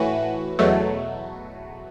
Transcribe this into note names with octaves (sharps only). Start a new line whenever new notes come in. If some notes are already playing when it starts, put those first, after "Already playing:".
Already playing: A2 E3 A3 F#4 B4
E2 B2 F#3 A3